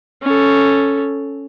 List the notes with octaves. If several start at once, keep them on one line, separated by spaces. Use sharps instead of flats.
C#4 A4